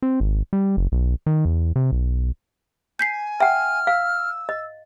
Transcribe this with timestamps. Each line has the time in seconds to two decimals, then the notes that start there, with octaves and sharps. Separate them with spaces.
0.02 C4
0.20 G#1
0.53 G3
0.77 F#1
0.92 B1
1.26 D#3
1.45 E2
1.76 C3
1.92 B1
2.99 G#5 G6 B6 C7
3.40 E5 F#5 G5 F6
3.87 F5 E6
4.49 D#5